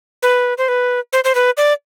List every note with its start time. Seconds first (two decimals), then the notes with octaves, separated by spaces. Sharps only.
0.23 B4
0.58 C5
0.68 B4
1.13 C5
1.24 C5
1.35 B4
1.57 D5